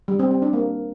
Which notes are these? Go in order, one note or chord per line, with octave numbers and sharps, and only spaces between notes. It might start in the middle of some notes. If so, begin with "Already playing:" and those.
G3
C4
C4
D4
A#3